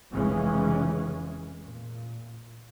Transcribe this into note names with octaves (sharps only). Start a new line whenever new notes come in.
F1 C#3 E3 G#3 C#4
A#2